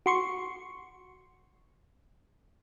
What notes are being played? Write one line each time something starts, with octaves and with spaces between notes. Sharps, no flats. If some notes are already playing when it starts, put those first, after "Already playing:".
F#4 C6 C#6